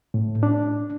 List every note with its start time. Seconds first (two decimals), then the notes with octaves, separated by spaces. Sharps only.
0.14 A2
0.43 D4